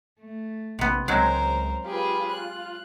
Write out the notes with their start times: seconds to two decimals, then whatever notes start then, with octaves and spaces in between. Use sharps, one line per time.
0.21 A3
0.79 A#1 C3 B3
1.08 C#2 F#3 G#3 C4 A#4 C5
1.84 F4 G4 G#4 B4
2.30 F#6